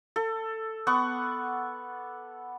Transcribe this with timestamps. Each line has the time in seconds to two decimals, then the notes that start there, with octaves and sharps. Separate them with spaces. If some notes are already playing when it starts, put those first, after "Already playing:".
0.16 A4
0.87 B3 F#5 C#6 D6